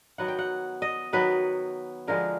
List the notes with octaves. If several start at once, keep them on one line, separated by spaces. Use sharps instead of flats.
D#3 F#3 B3 F#5
G5
F#5
D#5
D#3 F#3 B3 B4
D3 F3 G#3 B3 A#4